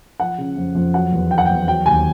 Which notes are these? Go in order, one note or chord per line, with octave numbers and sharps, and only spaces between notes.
F3 F#5
C#3
F2
F2
F#3 F#5
E2
F#3 G5
F#5
E2 G5
F#3 G5
D#2 G#5